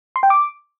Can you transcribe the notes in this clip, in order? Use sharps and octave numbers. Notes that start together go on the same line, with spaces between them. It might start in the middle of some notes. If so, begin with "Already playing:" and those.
C6
G5
D6